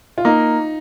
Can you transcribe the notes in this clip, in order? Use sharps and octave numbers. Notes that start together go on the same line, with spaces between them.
F4
A#3 D#4